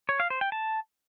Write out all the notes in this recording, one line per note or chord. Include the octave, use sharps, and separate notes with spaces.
C#5
F5
C5
G5
A5